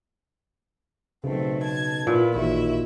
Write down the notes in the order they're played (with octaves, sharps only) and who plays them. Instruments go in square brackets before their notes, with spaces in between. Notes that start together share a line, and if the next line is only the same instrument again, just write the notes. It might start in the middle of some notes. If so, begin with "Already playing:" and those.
[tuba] B1 [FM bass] C#3 [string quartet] F#3 A3 C4
[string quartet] A5 G#6
[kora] A#2 [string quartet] B3 E4
[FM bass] A1 [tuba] D#2 [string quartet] E4 F#4 E5